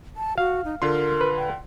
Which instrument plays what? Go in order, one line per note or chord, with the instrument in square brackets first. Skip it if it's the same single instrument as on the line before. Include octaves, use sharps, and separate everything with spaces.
[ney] A5
[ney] F#4 [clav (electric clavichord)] F5
[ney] D#4
[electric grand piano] D3 F4 C6 [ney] A#4
[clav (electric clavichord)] B4
[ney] G5